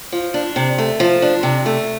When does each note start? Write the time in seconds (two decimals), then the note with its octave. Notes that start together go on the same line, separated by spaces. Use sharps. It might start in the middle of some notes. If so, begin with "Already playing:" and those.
0.12 F3
0.34 D4
0.56 C3
0.78 A3
1.00 F3
1.22 D4
1.43 C3
1.66 A3